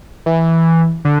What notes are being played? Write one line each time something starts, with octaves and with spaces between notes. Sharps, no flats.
E3
D3